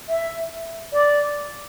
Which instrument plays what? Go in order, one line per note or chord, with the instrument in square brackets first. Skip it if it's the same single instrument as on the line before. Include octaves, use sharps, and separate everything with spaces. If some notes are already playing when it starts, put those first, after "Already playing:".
[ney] E5
D5